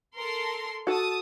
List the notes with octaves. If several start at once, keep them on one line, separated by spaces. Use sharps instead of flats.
A4 A#4 C6
F#4 A4 A5 D#6